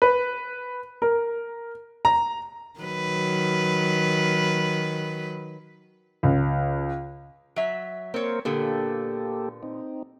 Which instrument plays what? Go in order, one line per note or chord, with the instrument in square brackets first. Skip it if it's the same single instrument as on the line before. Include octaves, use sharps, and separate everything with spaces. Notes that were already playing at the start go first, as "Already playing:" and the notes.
[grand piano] B4
A#4
A#5
[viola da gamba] D#3 F#3 B4
[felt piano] C#2
[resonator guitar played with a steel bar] F#3 E5
[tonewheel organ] A#3 A#4 C5 [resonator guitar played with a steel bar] C4 C#5
[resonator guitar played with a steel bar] A#2 D3 B3 [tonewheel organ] A#3 G4 A4
[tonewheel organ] C4 D#4